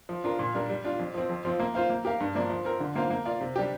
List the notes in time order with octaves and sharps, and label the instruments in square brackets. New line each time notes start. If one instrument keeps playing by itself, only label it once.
[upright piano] F3
D4 F4 A#4
A#2
G3 D4 A#4
G3
D4 F4
F2
F3 C4
F2
F3 C4 F4
A#3
F4 C5 F5
A#3
G4 A#4 F5
G2
F3 A#3 D4
F3
C4 A#4
D3
A#3 F4 C5 F5
A#3
F4 D5 F5
C3
G3 D4 G4